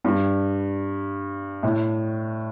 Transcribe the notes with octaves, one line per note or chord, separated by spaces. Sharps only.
G2
A2